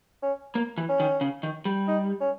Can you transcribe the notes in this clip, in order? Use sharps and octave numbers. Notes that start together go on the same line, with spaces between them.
C#4
A#3
E3
C#4
D#3
C#3
D#3
G3
D#4
C#4